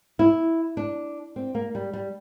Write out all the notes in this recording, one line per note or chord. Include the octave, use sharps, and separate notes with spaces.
E4
D4
C4
A#3
G3
G3